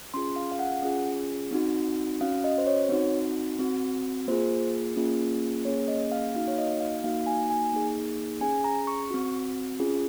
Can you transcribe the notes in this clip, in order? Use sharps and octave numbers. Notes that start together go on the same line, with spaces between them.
C#4 F4 G#4 C6
F5
F5
F#5
C#4 F4 G#4
C4 D#4 F#4
C#4 F#4 F5
D#5
C5
C#5
C4 D#4 F#4
C4 F#4
A#3 F4 G#4 C5
A#3 C#4 F4 G#4
A#3 C#4 G#4 C#5
D#5
F5
A#3 D#4 F#4 F5
C#5
D#5
F5
A#3 D#4 F#4 F5
G#5
G#5
A#3 D#4 G#4
C#4 G#4 G#5
A#5
C#6
C4 F#4
C#4 F4 G#4